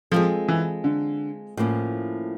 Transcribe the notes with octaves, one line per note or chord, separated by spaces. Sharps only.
F3 G#3 C4 F4 A4
E3
D3
A2 F3 A#3 C#4